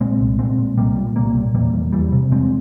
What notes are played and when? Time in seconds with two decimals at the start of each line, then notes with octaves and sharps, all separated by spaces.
0.01 A#2 G#3 C4
0.20 C2
0.39 A#2 G#3 C4
0.58 A#2
0.77 C2 G3 A#3
0.97 A#2
1.16 C2 G3 A#3
1.36 A#2
1.55 E2 G3 A#3
1.74 E2
1.93 E2 E3 G3
2.12 C3
2.31 E2 G#3 C4